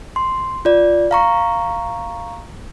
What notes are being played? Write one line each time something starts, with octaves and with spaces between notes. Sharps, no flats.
C6
F4 D5
F5 A#5 C#6